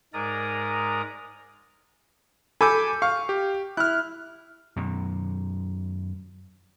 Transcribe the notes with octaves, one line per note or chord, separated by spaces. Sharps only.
G#2 G#3 A#4 D5 A#5 D#6
A4 G#5 B5 D6 G6
F5 C#6
G4
E4 F6 F#6
F#2 B2 D#3